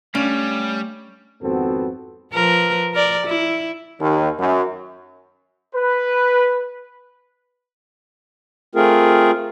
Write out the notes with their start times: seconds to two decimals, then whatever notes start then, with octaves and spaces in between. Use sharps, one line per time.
0.15 G3 A3 C#4 D5 F5
1.41 G#1 F2 B3 C4 F#4 A4
2.32 F3 A#4 B4
2.94 A#4 D5
3.26 E4
4.00 D#2
4.39 F#2
5.76 B4
8.75 A3 C4 F4 G#4 A#4